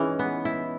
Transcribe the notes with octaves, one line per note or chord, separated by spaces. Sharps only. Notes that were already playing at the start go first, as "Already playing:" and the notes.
Already playing: E3 G#3 C#4 D#4
B3
E4